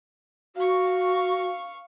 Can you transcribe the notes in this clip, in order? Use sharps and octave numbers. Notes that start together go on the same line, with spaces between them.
F#4 F5 C#6